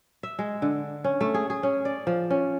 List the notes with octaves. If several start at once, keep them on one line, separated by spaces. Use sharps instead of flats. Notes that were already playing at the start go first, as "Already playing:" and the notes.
E5
G#3
D3
C#4
A3
G#4
G#4
C#4
D5
F3
C#4